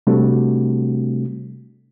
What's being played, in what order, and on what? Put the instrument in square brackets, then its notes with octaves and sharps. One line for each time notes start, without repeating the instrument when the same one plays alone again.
[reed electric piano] C3 G3 A3 C4 D4 F#4